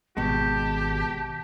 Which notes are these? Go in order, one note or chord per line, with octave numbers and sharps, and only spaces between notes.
G#1 B2 G#3 G4 A5